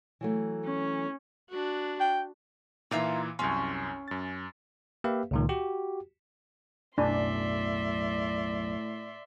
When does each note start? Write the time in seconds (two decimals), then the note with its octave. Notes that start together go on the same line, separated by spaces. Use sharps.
0.21 E3 F#3 A3
0.65 C#4
1.50 D4 F#4
2.00 G5
2.91 A#2 E3 D#4 F4 E5
3.39 C2 F#2 C#4 C6
4.08 F#2 A6
5.04 A#3 G4 B4 E5 F5
5.31 C#2 A#2 D#3
5.49 F#4 G4
6.98 B1 F#2 A2 D4 D5 E5 G#5 C6